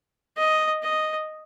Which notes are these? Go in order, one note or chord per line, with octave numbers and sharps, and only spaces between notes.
D#5
D#5